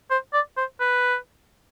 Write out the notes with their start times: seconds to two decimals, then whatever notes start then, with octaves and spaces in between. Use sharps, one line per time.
0.10 C5
0.33 D5
0.57 C5
0.80 B4